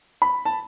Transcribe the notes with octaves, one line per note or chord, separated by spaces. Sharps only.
B5
A5